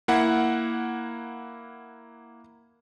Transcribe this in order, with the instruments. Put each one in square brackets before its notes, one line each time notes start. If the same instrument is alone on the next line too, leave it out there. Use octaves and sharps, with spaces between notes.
[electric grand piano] A#3 E4 F#5